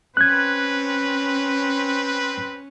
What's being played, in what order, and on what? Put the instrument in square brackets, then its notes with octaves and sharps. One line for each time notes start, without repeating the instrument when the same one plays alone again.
[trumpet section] C4 B4 [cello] C#4 [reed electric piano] F#6 G#6